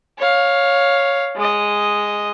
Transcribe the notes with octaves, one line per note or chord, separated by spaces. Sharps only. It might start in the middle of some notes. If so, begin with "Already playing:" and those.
C#5 F5
G#3 D#5